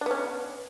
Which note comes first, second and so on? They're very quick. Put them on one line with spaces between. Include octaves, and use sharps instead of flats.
D4 B3 C#4